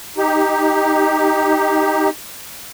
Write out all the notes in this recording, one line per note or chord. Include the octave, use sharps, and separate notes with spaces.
D#4 G4